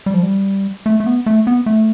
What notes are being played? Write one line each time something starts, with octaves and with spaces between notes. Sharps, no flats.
G3
F3
G3
A3
A3
B3
A3
B3
A3